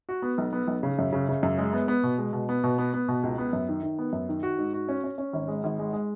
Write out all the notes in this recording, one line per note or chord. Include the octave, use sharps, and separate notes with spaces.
F#4
B3
B1
B3
B1
C#3
F#2
C#3
C#3
F#2
G#3
B3
B3
B2
G#3
B2
B3
B2
B3
B3
B2
C#2
B3
F#2
D#3
D#3
B3
F#2
D#3
F#4
G#2
F#4
C#4
C#4
C#4
G#1
G#3
G#1
G#3
G#3